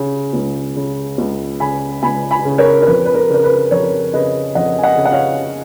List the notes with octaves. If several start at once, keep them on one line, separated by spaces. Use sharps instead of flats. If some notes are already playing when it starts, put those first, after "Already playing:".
Already playing: C#3
C#2
C#3
C#2
C#3 G#5 B5
C#2 G#5 B5
G#5 B5
C#3
A#4 C#5
A#4
F2 B4
B4
A#4
C#3 A#4
B4
F2 A#4 C#5
C#3 B4 D#5
F2 D#5 F#5
G#5
D#5 F#5
C#3
F#5
C#5 F5